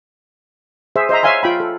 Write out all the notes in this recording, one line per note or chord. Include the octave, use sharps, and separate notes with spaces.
G#4 C5 E5
C5 D#5 E5 A#5
C#5 E5 F5 G#5 C6
F4 G5 B5
A4